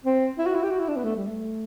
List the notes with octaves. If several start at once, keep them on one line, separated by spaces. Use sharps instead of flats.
C4
E4
F#4
E4
G4
F#4
E4
D4
B3
A3
G3
A3